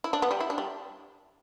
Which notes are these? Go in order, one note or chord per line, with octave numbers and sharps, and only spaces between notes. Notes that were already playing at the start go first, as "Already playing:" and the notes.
E4
D4
B3
G3
E4
D4
G3